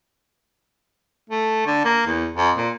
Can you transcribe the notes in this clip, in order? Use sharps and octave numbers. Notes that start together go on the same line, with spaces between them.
A3
D3
A#3
E2
F2
A#2